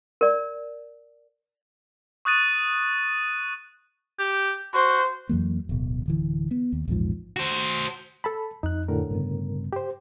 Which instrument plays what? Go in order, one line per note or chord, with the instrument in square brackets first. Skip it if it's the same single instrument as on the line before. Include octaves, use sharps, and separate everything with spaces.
[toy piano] A#4 D5
[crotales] C#6 D#6 F#6 A6 D#7
[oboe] G4
[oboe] F#4 [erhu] C5
[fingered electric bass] F2 E3 F#3 A#3
D1 G1 B2
D1 D3 E3
B3
D#2
A#1 E2 G#2 F3
[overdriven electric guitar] F#4 C5
[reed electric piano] A4 A5 B5
[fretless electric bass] F2 [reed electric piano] D#4 F#6
[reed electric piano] A2 D3 A#4
[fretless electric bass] G2 C#3 B3
[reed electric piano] G4 C5